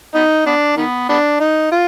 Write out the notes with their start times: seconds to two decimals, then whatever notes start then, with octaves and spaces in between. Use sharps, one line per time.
0.15 B3 D#4
0.46 B3 D4
0.77 D#3 B3
1.09 B3 D4
1.40 D#4
1.72 F4